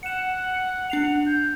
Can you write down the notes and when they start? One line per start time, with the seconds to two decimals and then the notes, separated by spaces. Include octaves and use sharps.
0.03 F#5 C#7 E7
0.90 D4 F#5 C7 F7
1.26 G6